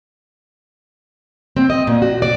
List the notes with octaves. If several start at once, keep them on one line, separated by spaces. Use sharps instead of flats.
C4
D#5
A#2
F#4
D5